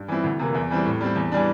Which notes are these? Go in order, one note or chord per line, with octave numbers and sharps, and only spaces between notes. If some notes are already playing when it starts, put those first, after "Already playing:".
Already playing: G2
E3 G3 C4 E4
D2
C3 E3 A#3
E2
E3 G3 C4
A2
G3 C4
E2
E3 G3 D4